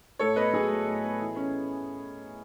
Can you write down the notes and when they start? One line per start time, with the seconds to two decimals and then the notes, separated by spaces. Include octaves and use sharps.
0.19 A2 A4 C#5
0.36 B3 B4 D#5
0.53 F#3 G#4
0.69 A2
0.87 A2
1.04 B3
1.20 E3
1.36 C#4